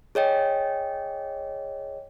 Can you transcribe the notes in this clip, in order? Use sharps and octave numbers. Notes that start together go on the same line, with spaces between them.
G#4 C#5 D#5 G5